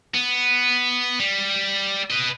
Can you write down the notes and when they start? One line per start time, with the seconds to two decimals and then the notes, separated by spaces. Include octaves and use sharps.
0.14 B3
1.20 G3
2.10 B4 D#5